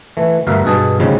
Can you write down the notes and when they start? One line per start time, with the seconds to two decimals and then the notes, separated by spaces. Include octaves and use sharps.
0.17 E3 A3
0.47 D2 G2 B3 A#4 E5 F5
0.65 G2 B2 G#4 A5
1.00 D2 G#2 C#3 F3 G3 G#3